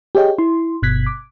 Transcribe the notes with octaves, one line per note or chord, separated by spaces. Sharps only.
G4 G#4 C#5 D#5 G5
E4 C6
G1 B2 F#6 G#6 B6
D6